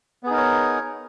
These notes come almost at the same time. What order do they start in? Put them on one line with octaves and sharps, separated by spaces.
B3 G#4 D#4 A#4 C#5